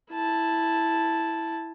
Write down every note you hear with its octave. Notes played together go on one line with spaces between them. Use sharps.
E4 A5